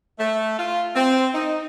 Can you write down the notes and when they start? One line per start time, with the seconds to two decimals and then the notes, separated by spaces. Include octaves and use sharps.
0.19 A3
0.59 F4
0.95 C4
1.33 D#4